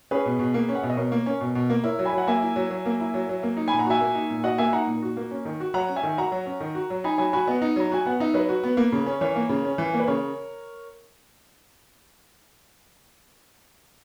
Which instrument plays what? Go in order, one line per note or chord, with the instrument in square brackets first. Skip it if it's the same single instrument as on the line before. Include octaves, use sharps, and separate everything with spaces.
[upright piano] C#4 [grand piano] G#4 B4
[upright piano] B2
B2
A#3
C#4
[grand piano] F#5
[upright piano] B2 [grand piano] E5
[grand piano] D#5
[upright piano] B2 [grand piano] A#4 C#5
[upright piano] A#3
C#4
B2
B2
A#3
[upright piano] E4 [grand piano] A#4 C#5
[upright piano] F#3
[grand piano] G#5 B5
[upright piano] F#3
[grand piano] F#5
[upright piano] A#3 [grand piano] E5 G#5
[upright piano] E4
F#3
F#3
A#3
E4
F#3
F#3
A#3
D#4
[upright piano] A#2 [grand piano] G#5 B5
[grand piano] F#5 A#5
[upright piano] F#4 [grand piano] E5 G#5
[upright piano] A#3
D#4
A#2
[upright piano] F#4 [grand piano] D#5 F#5
[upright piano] A#3 [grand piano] E5 G#5
[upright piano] D#4 [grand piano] F#5 A#5
[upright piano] A#2
F#4
A#3
C#4
D#3
F#4
[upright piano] F#3 [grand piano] F#5 A#5
[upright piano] C#4
[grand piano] E5 G#5
[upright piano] D#3
[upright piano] F#4 [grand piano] F#5 A#5
[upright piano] F#3
C#4
D#3
F#4
F#3
[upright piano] D#4 [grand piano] G#5 B5
[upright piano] F#3 [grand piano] G#5 B5
[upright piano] F#4 [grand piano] G#5 B5
[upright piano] B3 [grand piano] D#5 F#5
[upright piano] D#4
[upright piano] F#3 [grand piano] A#5
[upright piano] F#4 [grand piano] G#5
[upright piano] B3 [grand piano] F#5
[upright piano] D#4 [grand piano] E5
[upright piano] F#3 [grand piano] B4 D#5
[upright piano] F#4
B3
A#3
C#3
C#4
[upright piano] E3 [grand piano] A#4 C#5
[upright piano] A#3
C#3
C#4
E3
A#3
[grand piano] B4
[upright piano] C#3 [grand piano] A#4 C#5